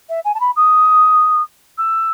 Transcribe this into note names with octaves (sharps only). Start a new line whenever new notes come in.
E5
G#5
A5
B5
D#6
E6